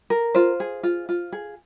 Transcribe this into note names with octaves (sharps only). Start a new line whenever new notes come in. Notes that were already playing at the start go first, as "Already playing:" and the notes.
A#4
F4 C5
G#4
F4
F4
G#4